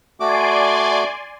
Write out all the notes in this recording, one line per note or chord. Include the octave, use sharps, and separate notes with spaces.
A3 F#4 D5 G#5 C6 D6